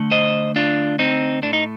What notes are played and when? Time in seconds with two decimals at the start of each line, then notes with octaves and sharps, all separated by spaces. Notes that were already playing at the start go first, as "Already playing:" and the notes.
Already playing: D2 D3 A3
0.11 C5 D#5
0.56 D4 F4
0.99 C4 D#4
1.42 A2 A3 D4
1.53 D#4